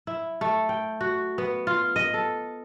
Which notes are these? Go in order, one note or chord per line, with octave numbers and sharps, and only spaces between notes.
E4
A3
G5
F#4
B3
F4
D#5
A4